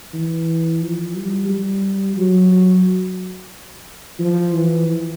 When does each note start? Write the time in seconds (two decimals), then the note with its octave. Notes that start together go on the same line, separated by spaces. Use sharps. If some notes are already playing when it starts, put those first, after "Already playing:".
0.13 E3
0.82 F3
1.15 G3
1.49 G3
2.17 F#3
4.19 F3
4.53 E3